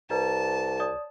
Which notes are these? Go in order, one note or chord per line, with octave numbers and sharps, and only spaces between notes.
C2 B4 D5 A5 A#5
C#5 D5 D#6